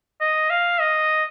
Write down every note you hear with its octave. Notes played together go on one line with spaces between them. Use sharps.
D#5
F5
D#5